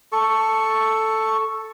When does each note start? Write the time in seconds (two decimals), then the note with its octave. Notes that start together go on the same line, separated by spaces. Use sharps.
0.12 A4 C#6